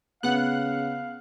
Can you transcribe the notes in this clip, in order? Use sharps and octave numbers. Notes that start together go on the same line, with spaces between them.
C#3 B3 F5 F#5 F#6